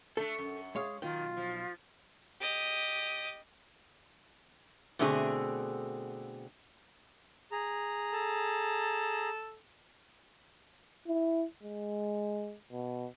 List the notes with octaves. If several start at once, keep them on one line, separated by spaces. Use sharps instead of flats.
A3 D4 A4
F#2
G#3 G#4 C#5 F5
B1 D#3 F4 G5
F3
G4 D#5
B2 D3 A3 C4 E4 G#4
G#4 A#5
A4
E4
G#3
B2